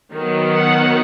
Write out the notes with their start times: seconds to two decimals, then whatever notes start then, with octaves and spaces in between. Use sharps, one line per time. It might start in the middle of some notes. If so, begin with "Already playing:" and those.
0.13 D#3 F#3 B3
0.55 F#5